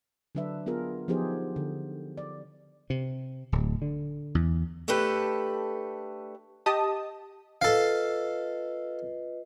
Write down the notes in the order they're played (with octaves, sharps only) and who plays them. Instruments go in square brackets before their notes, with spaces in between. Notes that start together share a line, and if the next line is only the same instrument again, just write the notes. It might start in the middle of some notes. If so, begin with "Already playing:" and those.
[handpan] D3 F#3 D4 B4 E5
B3 F4 G#4 A#4
F3 B3 D#4 G4 G#4 C5
D3
D5
[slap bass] C3
D1
D3
E2
[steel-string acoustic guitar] A3 D4 G4 A4 B4
[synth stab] G4 D#5 A5 D#6
[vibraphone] F4 B4 D#5 [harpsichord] A4 F5